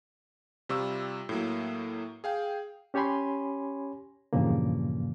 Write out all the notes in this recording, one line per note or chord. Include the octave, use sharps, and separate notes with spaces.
C3 G3 F4 C#6 E6
A2 F#3 A#3
G#4 F5 G5
C#4 G4 C#5 G#5 B5 C6
E2 G2 A#2 C#3 F3 A#3